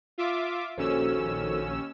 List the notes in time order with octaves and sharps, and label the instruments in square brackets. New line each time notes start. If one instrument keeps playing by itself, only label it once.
[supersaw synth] F4 E5 D6
[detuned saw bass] A#1 [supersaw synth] D#2 C#4 E6 [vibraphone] F#4 A4 C5